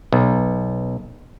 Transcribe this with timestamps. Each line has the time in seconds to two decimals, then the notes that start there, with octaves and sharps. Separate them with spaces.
0.13 B1